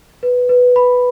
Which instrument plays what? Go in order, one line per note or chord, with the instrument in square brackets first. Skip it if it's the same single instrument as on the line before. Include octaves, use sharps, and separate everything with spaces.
[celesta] B4
B4
B5